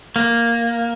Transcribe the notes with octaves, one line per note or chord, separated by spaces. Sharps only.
A#3